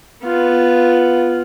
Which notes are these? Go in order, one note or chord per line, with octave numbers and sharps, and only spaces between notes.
B3 F4